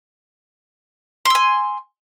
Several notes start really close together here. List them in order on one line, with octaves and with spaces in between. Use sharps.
C6 E6 G#5